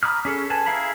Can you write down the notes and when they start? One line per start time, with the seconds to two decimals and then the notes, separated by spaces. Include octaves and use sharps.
0.03 A#5 B5 D6 D#6 F6
0.25 C#4 G#4 A4
0.50 B4 G#5 A5
0.66 E4 G#4 F5 A#5 B5